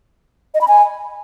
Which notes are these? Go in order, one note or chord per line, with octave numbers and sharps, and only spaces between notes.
D#5
B5
G#5